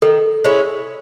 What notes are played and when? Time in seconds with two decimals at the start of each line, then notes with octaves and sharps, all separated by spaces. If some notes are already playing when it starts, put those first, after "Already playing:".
0.02 D#3 A4
0.44 G#3 C#4 E4